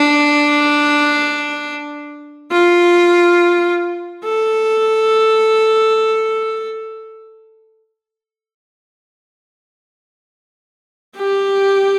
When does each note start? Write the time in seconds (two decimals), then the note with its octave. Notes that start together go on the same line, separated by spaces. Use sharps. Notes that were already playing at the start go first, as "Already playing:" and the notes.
Already playing: D4
2.51 F4
4.24 A4
11.17 G4